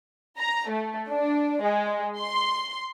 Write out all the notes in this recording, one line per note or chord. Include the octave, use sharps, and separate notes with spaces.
A#5
A3
D4
G#3
C6